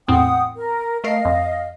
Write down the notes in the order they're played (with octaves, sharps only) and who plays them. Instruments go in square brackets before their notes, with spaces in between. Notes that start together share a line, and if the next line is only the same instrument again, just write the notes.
[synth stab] E2 A2 C4 [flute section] F#5 G5 D#6
[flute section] A#4
[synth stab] A3 A#4 C7 [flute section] D#5 F5
[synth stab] F2